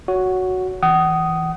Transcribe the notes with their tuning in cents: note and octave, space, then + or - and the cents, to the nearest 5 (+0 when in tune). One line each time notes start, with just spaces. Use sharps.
F#4 +0 C#5 +20
E3 -15 F#5 +35 D#6 +0